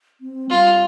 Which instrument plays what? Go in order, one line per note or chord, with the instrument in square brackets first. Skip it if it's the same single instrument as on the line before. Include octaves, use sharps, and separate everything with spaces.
[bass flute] C4
[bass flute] G3 [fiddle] F4